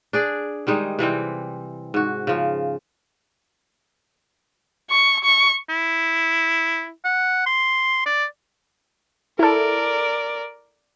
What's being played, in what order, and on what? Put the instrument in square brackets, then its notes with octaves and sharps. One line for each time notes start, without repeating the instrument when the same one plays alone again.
[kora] D4 G#4 D5
D#3 G3 G#3 D#4
C3 E3 G3 C4
G#2 F#4
C#3 F3
[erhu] C#6
C#6
[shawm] E4
F#5
C6
D5
[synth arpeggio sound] E4 A4 [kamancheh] A#4 D5